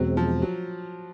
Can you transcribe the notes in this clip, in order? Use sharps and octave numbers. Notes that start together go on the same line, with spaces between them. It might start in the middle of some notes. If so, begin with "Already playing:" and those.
Already playing: E2 B2 F#3 G#3 C4
F3
F#3